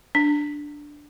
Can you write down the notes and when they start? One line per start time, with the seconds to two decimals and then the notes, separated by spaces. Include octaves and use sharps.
0.15 D4